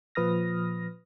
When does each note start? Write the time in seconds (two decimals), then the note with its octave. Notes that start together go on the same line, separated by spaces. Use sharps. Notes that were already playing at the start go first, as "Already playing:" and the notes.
0.15 A#2 F3 B4 D#6 F6 A#6